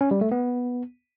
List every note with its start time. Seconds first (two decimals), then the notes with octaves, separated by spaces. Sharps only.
0.01 C#4
0.11 G3
0.21 A3
0.31 B3